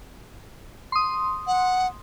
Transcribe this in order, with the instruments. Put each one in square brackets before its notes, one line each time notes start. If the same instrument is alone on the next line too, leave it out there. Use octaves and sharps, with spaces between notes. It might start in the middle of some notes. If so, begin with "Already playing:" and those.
[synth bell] C6 D#6
[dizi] F#5